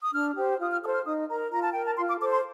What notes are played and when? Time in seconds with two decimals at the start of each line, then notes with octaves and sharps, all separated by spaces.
0.02 D#6
0.13 D4 F6
0.36 G4 C5
0.59 F4 D#6
0.70 F6
0.81 A4 C5 D#6
0.93 F6
1.05 D#4 D#6
1.28 A#4 A#5
1.51 F4 A#5
1.62 A5
1.72 A#4 G5
1.85 A5
1.97 F4 C6
2.08 D6
2.20 A4 C5 D6
2.31 C6